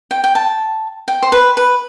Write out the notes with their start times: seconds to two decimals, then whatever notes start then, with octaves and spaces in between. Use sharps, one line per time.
0.11 G5
0.24 G5
0.35 A5
1.08 G5
1.22 C5
1.32 B4
1.57 B4